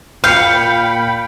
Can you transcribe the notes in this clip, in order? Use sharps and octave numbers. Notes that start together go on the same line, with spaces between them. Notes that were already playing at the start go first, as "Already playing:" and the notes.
A#2 F5 G5 B5 G6 C#7